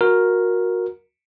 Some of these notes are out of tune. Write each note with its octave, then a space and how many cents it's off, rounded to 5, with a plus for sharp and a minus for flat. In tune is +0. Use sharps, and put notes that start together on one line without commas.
F#4 -20 A#4 +5